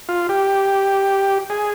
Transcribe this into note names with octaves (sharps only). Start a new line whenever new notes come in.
F4
G4
G#4